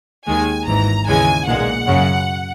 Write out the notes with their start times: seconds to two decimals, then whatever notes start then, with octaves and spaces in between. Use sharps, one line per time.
0.27 D#2 D#3 G#3 G#5
0.67 G#1 G#2 E3 A#5
1.07 D#2 C#3 E3 G#3 G#5
1.47 B1 A#2 G#3 F#5
1.86 F#2 C#3 F#3